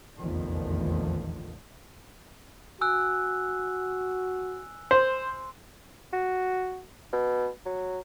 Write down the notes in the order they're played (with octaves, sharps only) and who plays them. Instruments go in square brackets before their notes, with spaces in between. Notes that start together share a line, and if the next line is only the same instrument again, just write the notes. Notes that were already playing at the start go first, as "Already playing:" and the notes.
[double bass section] F1 A#1 E2 D3 D#3 F3
[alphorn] F#4 [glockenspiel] G#5 E6 F#6
[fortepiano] C5 [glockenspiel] C6
[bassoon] F#4
B2
F#3